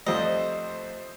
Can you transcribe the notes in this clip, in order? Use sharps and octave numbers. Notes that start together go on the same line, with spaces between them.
F2 G3 A3 C5 D#5